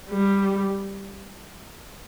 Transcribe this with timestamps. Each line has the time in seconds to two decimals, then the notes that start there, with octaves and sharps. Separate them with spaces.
0.10 G3